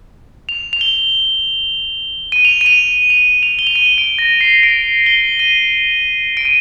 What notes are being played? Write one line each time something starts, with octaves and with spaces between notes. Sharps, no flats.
F7
F7
G7
D#7
F7
D#7
F7
F7
F7
G7
F7
D#7
D7
A#6
C7
D7
G7
D#7
D7
D#7